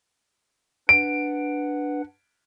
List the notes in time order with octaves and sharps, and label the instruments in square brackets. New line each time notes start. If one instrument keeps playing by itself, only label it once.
[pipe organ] D4 B4 F#5 [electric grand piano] D7